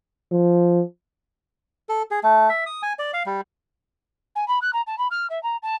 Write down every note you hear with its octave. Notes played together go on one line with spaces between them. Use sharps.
F3
A4
G#4
A3
E5
D#6
G#5
D5
F5
G3
G#5
B5
F#6
A#5
A5
B5
F6
E5
A#5
A5